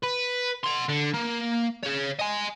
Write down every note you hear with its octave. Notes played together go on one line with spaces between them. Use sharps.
B4
F#5 C6
D3
A#3
G#4 C#5
D#5 G#5